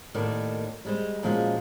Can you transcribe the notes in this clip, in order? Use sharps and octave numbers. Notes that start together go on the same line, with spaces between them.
D#2 A2 D#3 D5
G3 G#3 C5
A#2 F3 F#3 G#3 C#4